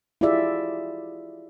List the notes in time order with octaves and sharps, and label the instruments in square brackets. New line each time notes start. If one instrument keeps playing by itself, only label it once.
[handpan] E4 F4 G4 G#4 D5 E5